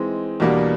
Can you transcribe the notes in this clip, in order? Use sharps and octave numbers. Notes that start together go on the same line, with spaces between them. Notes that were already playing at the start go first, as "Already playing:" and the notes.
Already playing: E3 G#3 C4 D#4
E2 B2 G3 A#3 D4